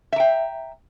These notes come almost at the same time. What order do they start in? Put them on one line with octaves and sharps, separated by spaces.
E5 A#5 G5